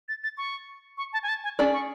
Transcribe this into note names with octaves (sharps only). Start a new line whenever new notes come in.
A6
A6
C#6
C#6
A5
G#5
A5
G#5
C#4 G#4 D5 A5
C#6